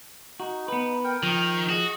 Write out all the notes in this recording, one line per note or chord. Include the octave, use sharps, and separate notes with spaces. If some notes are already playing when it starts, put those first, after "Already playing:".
D#4 F#4
B3 B4
A#4 G5
D#3 F3
F#4 G#4 D#5